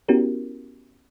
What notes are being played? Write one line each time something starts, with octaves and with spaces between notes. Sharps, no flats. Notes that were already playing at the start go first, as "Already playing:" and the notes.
B3 C#4 E4 F#4 G4 A#4